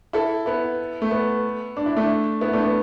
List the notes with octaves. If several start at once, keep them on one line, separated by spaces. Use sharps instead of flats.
E4 A4
B3 E4
A3
B3
D4
E4
A3 D4
B3 E4
A3 D4
B3